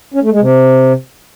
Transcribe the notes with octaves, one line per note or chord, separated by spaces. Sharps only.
C#4
A3
G#3
C3